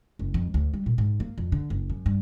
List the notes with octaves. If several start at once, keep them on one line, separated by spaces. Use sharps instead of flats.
F#1
F2
D2
G3
A#2
G#2
A#3
F2
D3
F#1
F#2
G2